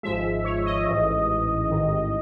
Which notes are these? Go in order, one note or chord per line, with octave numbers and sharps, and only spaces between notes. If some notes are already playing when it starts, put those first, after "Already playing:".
G#1 G#2 F3 G#3 E5
C#5
D#5
A1 G#2 E3
A1 G#2 D#3